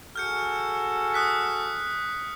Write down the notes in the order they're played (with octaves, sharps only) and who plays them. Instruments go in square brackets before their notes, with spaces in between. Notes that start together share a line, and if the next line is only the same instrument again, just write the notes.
[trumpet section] F#4 G#4 A4 [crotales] F6 G6 C#7
[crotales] D#6 F#6 B6